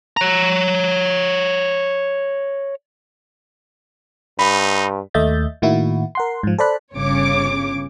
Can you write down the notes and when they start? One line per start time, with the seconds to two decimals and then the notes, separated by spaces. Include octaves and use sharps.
0.17 C#5 A#5
4.39 G2 D#4 B5
5.14 D#2 A3 D#5 E5 G6 A6
5.62 A2 D#3 A#3 E4 F#4
6.15 A#4 F#5 C6
6.43 G#2 F3
6.58 A4 C5 D5 B5 F#6
6.95 G1 C#3 C#5 D6